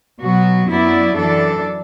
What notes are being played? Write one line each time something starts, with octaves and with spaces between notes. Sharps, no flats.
B2 F#3 B3 F#4
F#2 F#3 B3 E4 D5
F#2 E3 D4 A4 D5